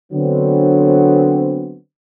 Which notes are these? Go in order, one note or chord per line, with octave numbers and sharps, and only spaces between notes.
D3 F#3 B3 C4